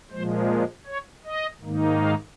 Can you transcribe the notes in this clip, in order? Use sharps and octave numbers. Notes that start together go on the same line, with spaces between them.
A#2 F3 G#3 C5
C#5
D#5
G#2 D#3 A#3 D#4
F5